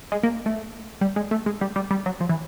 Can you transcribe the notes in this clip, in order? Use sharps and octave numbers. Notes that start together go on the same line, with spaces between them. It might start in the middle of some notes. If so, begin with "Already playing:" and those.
G#3
A#3
A3
G3
G#3
A3
G#3
G3
G3
G3
F#3
F3
E3